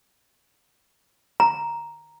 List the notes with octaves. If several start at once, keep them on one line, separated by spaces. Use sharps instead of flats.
A#5